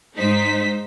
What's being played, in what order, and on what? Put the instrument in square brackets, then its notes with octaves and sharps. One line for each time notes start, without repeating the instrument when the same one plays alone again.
[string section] G#2 D#4 C5 B6